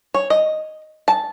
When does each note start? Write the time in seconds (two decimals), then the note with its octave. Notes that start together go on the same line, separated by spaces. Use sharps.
0.14 C#5
0.30 D#5
1.08 A5